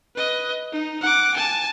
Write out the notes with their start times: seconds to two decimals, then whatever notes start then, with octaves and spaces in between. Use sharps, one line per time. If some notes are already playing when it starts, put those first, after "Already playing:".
0.15 B4 D#5
0.72 D#4
1.01 F#5 D6
1.34 G#5 A5